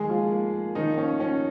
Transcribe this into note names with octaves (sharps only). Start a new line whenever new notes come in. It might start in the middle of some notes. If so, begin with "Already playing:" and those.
Already playing: D#3 G#3 G#4
F3 A#3 F4
A#3
A#3
D#3 F3 D#4
A#3 C#4
F3 C#4